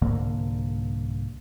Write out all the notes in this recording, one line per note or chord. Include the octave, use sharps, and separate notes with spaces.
C2 G#2 D3 A#3